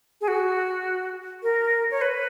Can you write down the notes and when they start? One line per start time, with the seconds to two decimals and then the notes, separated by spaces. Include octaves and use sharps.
0.21 G#4
0.28 F#4
1.43 A#4
1.91 C#5
2.01 B4